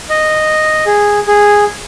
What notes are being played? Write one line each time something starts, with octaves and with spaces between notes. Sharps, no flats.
D#5
G#4
G#4